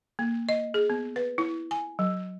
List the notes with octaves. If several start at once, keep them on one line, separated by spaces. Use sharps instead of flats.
A#3
D#5
G#4
B3
B4
E4
G#5
F#3